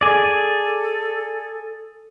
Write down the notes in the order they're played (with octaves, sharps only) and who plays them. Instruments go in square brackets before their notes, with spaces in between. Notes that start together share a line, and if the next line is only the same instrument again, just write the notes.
[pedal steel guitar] G#4 D5 [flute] A4